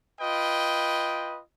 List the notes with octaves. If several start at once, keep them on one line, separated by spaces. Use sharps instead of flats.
F4 B4 D#5 G5